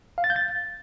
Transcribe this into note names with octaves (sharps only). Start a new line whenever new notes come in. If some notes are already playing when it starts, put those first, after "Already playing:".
F5
A6
G6
A6